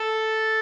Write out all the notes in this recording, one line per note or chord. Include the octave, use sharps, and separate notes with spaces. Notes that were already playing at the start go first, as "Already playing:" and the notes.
Already playing: A4 A5